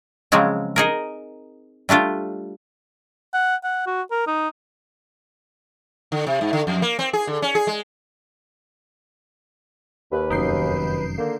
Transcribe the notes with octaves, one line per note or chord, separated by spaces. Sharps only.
C#3 F3 F#3 G#3 C4
D#4 G#4 A#4
G3 A3 D4 F4
F#5
F#5
F#4
A#4
D#4
D3
C3
G#2
D3
F2
A#3
C4
G#4
D3
C#4
G#4
G#3
D#2 B4
F1 F#2 D#3 G6 C7
D3 A#3